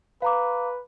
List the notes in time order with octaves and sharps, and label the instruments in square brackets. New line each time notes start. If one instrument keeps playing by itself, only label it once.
[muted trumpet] B4 [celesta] F5 A#5 D6